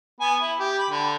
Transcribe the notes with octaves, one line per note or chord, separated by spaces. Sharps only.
B3 G#5
E4
G4
B5
D3